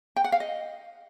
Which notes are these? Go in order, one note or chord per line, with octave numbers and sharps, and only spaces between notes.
G5
F#5
F5
D#5